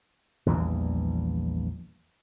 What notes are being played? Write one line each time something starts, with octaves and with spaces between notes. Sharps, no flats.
A#1 E2 E3 G3